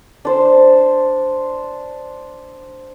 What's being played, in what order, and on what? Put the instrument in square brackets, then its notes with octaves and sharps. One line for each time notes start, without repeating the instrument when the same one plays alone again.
[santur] D4 C5